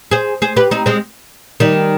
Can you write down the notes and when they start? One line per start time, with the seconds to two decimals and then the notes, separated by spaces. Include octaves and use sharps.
0.11 G#4 C5
0.42 G#4 C5
0.56 G4 B4
0.71 C4 D#4
0.86 G#3 C4
1.60 D#3 G3